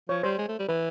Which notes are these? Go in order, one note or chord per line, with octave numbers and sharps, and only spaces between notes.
F3 C#5
G3 C5
G#3
A3
G3
E3 B4